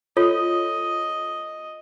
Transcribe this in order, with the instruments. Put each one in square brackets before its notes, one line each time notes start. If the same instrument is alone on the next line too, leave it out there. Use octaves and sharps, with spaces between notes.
[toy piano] F4 A4 C#5 [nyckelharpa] D#5